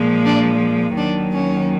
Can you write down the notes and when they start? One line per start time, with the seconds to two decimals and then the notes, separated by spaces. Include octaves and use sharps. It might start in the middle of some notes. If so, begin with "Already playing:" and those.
Already playing: A#2 F3 G#3
0.25 D4
0.97 D#2 D#3 F#3 D4
1.33 C#4